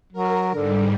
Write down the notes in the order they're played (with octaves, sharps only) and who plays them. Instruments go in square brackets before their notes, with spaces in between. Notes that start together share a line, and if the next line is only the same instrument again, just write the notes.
[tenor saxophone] F#3 [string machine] A#4
[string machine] G#2 G3 [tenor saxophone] D3